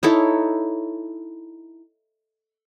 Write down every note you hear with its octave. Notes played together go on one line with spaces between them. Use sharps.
D#4 E4 A4 C#5